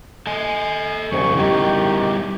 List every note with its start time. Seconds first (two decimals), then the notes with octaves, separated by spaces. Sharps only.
0.27 A4 D#5 G#5
1.12 C2 F2 C#3 C#6
1.37 D#3 G3 C#4 E4 G4